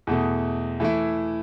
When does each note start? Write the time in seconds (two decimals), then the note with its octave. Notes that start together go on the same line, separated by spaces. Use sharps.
0.07 E2 B2 A3
0.80 E3 A3 E4